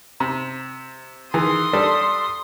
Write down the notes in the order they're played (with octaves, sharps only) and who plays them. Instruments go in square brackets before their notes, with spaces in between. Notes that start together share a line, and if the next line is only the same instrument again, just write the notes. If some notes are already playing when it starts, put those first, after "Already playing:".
[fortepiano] C3
[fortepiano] D#3 E3 G#4 [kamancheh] C6 D#6
[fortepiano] G3 D4 A4